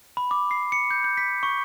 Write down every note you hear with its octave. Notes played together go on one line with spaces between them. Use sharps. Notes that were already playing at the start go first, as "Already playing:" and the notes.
B5
D6
C7
C#7
G6
G6
B6
C#6